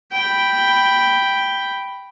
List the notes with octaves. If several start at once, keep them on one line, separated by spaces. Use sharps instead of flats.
G5 B5